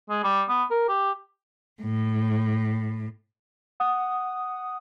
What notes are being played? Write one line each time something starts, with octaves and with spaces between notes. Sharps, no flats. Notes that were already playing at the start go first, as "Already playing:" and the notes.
G#3
G3
B3
A#4
G4
A2
F#5 D#6